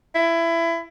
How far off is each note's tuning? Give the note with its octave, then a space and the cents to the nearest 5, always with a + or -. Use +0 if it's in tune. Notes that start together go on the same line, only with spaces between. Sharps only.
E4 +20